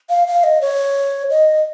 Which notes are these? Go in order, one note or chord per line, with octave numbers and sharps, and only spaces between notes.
F5
F5
D#5
C#5
D#5